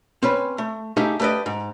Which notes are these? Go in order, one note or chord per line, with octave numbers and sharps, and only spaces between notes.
C4 C#4 B4
A3
A3 D#4 G4 G#4 E5 F5
A3 G4 B4 D5 D#5
G#2